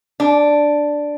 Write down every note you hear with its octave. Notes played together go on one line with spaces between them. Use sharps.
D4